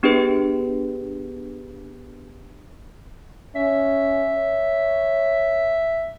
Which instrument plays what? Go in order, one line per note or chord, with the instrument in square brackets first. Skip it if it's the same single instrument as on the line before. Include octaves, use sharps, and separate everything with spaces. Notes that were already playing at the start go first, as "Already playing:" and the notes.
[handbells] B3 D4 G4 G#4 B4
[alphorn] C#4 [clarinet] E5
[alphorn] C#5